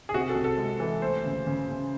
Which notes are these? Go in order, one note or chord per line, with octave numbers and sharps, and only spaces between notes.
G#4
C3 F#4
A4
C3
A4
G#3
E3
A3 C5
C#3
C#3
C#3